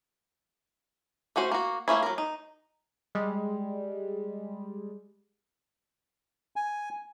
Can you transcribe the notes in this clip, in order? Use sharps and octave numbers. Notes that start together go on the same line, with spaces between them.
A3 C#4 F#4 C5
A#3 F#4
A3 A#3 C#4 E4
F#3 A#4
D#4
G3 G#3
G#5